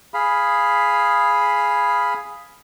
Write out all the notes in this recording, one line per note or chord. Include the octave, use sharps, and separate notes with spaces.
G#4 F5 B5